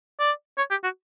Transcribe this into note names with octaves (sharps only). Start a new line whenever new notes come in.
D5
C#5
G4
F#4